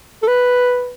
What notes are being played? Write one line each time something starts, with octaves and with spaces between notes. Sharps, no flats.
A4
B4